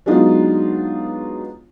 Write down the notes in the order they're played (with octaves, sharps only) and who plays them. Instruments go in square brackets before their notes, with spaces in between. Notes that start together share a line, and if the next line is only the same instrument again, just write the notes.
[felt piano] F#3 G#3 B3 D4 D#4 F4